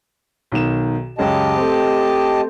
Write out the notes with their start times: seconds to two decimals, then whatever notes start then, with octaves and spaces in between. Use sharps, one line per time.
0.52 B1 D#3 E7
1.18 C#2 F#2 G#3 G4 D#5 A5
1.56 A3 C4 C5